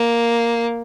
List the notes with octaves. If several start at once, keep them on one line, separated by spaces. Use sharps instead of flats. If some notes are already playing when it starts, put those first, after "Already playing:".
Already playing: A#3